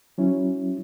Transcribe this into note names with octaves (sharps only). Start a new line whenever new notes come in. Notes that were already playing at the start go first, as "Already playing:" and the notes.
F#3 C#4 E4